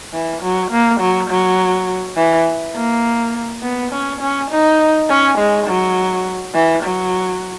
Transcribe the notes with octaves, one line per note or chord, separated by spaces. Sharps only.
E3
F#3
A#3
F#3
F#3
E3
A#3
B3
C#4
C#4
D#4
C#4
G#3
F#3
E3
F#3